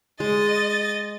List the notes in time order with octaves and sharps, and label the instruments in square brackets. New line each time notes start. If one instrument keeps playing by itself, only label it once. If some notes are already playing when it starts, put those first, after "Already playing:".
[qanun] G#3 [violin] D#5 A6